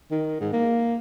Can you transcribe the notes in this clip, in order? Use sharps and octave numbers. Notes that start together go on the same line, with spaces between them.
D#3
G#2
A#3